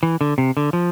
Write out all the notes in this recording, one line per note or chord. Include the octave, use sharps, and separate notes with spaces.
E3
D3
C3
D3
F3